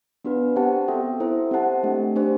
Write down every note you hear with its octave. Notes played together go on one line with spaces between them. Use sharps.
B3 D4 F#4 B4
C4 G4 C5 F#5 A5
B3 F#4 A4 E5 G5
E4 A4 C5 E5
C4 G4 C5 F#5 A5
A3 D4 G4
D4 G4 C5